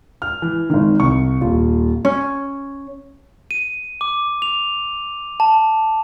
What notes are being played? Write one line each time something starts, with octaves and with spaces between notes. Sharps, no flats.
F6
E3
G#1 D#3
C2 C#6
D#1 F4
C#4
D#7
D6
F7
A5